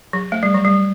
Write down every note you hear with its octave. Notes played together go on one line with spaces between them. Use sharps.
F#3
A3
G3
F#3
G3